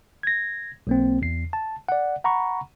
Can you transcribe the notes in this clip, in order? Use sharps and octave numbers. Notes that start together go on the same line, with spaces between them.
G#6 A#6
B1 A#3 C4
E2 C7
A5
D5 F#5
F#5 A#5 B5 C#6